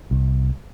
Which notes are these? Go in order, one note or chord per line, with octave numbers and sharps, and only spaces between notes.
C2